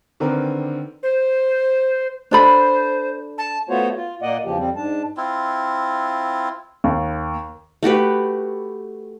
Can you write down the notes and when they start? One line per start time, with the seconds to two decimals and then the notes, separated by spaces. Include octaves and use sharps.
0.20 D3 D#3 C4 D4 A#4 B4
1.03 C5
2.31 D4 A4 C5 B5
3.38 A5
3.69 A3 B3 F4 F#4 C5 C#5
3.95 F4
4.22 A#2 A#3 D5 D#5 F#5
4.45 E2 C#3 F3 G4
4.58 F2 G3 C4
4.76 G#2 D4 A5
5.17 C4 E4 F4
6.84 D#2
7.83 A3 F#4 G4 B4